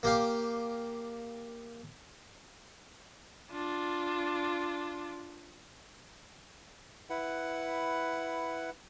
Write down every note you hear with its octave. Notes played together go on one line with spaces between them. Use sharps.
A#3 G4 F5
D4 F4
E4 B4 F#5